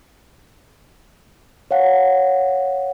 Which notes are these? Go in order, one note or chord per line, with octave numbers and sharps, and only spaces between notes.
C#5 F5 F#5